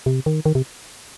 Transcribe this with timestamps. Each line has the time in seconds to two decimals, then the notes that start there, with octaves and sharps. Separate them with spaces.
0.06 C3
0.26 D#3
0.46 D#3
0.55 C3